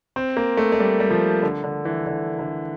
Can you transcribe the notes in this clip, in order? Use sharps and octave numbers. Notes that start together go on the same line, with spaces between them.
C4
A#3
A3
A3
G3
G3
F3
D3
D3
E3
D3
D3